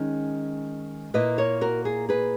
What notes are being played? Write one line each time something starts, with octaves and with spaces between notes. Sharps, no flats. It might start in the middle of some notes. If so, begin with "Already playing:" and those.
Already playing: D#3 G#3 C#4
A#2 A#3 E4 B4 D#5
A#4 C#5
F#4 A#4
G#4
G#4 B4